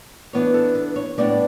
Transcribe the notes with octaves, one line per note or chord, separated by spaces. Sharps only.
E3 B3 D4 C#5
A4
B4
C#5
A2 G3 B3 D4 D5